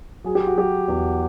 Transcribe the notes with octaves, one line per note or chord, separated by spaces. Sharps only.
F#3 G#4
G4
F#4
F#3 G4
E2